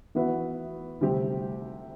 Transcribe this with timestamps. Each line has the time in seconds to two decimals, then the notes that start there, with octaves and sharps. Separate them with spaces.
0.15 E3 B3 F#4 B4 E5
1.01 D2 C3 G3 C4 G4